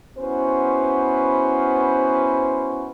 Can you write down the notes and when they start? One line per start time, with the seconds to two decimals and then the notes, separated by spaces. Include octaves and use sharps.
0.18 B3 C#4 E4 F#4 B4 C5